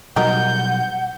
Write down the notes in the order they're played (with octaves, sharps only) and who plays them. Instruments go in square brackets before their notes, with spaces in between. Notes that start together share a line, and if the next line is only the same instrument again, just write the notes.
[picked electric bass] B2 F#3 G3 [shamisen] D#4 F#4 A#4 [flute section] F#5 [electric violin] G6